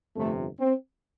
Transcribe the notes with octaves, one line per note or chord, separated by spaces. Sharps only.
G1 F2 C3 A3
C4